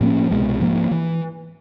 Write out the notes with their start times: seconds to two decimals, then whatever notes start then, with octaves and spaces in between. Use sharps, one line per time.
0.01 A2 F3 A#3 C#4
0.31 C2 B2 G#3
0.60 G#2 F3 A#3
0.91 E3